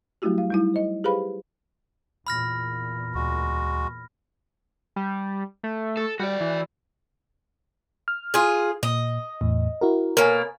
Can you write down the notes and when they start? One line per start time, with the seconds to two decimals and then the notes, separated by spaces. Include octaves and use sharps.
0.22 F#3 G3 A3 E4 F#4 G4
0.38 F5
0.50 G3 D#4 E4
0.74 C5 D#5
1.04 G4 G#4 B4 C5 F5 B5
2.27 E2 A#2 B5 F6 A#6
3.15 D2 G#3 F#4
4.96 G3
5.64 A3
5.97 A4
6.20 G3 F#4 D5
6.41 E3
8.08 F6
8.34 F4 G#4
8.83 A#2 D#5
9.41 E2 A2
9.81 E4 F#4 A#4
10.17 B2 A#3 A#4 C#5 G#5